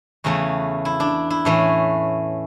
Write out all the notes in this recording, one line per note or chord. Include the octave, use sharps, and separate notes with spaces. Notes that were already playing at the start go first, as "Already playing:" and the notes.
E2 C#3 E3 A3 F#4
E4
D4
E4
A2 E3 A3 C#4